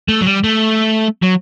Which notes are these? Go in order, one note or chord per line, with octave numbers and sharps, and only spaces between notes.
A3
F#3
G3
A3
F#3